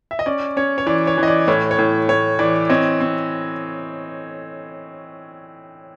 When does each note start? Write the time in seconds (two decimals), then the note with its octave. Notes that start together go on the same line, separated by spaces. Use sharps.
0.11 E5
0.19 D#5
0.26 C#4 D5
0.57 C#4 C#5
0.78 C#5
0.86 E3 D5
1.07 C#5
1.18 E3
1.23 D#5
1.28 D5
1.48 A2 C#5
1.71 C#5
1.79 A2
2.09 A2 C#5
2.39 E3 D5
2.70 C4 C#5 D#5
3.00 C4